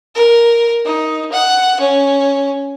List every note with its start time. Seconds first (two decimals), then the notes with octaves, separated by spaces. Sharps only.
0.15 A#4
0.85 D#4
1.32 F#5
1.80 C#4